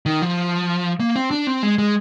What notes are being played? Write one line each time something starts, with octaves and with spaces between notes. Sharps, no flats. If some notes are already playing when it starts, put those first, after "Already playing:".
D#3
F3
A#3
C4
D4
C4
G#3
G#3